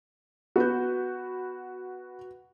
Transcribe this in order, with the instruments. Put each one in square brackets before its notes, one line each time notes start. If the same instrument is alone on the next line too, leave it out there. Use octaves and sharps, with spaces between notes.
[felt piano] B3 B4 G6 [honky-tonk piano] F#4